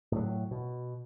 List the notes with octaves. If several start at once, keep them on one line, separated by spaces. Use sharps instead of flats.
A2 F#3
B2